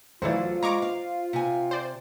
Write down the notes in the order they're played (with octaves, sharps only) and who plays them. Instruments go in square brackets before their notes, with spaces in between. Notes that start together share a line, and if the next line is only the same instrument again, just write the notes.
[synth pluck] D2 A2 E3 [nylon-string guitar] F#3 A4 D5 [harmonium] F4 [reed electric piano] C5
[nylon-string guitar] G#3 [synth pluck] A#5 C#6 D6
[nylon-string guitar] F5
C3 G#5
[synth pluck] C5 D5